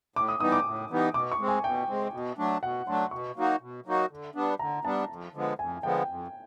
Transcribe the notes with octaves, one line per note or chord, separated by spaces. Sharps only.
A2 D6
D#6
E3 G3 B3 D#4 D#6
D6
A2
E3 G3 B3 D#4
B2 D6
C#6
G#3 C4
G#5
B2 G5
G#3 C4
B2
F#3 A3 D4
B2 F#5
F#3 A3 D4 C6
B2 C#6
F#3 A#3 D#4 F#4
B2
F#3 A#3 D#4 F#4
D3
G3 B3 D4
D3 A#5
G3 B3 D4 A5
F2
D3 F3 G#3 B3
F2 G#5
D3 F3 G#3 B3 G5
F2